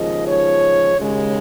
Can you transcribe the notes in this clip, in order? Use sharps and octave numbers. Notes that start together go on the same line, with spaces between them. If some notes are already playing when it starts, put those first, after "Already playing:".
Already playing: D#2 C#3 F3 G#3 D#5
C#5
D#2 C#3 G#3